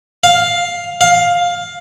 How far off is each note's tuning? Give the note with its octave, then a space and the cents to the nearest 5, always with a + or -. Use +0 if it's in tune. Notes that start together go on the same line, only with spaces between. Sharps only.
F5 +5
F5 +10